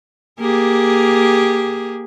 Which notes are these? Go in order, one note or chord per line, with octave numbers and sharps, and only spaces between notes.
A#3 G4 G#4